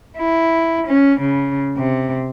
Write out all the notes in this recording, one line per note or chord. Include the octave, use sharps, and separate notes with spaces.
E4
C#4
C#3
C3